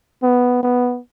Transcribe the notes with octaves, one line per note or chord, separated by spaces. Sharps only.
B3
B3